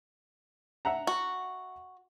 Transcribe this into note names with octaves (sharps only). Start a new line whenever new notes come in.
E5 F#5 A#5
F#4